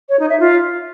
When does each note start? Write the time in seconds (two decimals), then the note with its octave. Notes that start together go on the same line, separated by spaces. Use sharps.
0.09 C#5
0.19 D#4
0.30 E5
0.40 F4